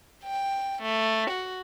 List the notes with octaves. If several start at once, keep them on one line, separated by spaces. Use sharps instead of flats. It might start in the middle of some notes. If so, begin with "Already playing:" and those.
G5
A3
F#4